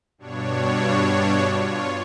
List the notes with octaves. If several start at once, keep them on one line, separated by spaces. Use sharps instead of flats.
G2 B2 D4 C#5
F4 C#5